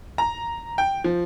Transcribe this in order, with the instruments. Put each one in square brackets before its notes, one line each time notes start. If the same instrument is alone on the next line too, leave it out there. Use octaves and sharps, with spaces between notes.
[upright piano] A#5
G5
F3